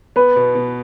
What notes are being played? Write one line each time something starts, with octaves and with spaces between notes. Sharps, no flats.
B3 B4
B2
B2